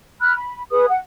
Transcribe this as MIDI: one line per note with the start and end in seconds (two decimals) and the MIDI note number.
0.21 0.34 83
0.21 0.34 89
0.21 0.34 90
0.36 0.62 83
0.70 0.87 68
0.70 0.87 71
0.70 0.87 87
0.89 0.99 78